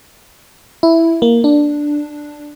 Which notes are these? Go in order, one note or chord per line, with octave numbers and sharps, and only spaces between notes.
E4
A#3
D4